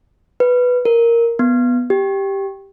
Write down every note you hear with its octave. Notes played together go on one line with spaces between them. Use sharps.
B4
A#4
B3
G4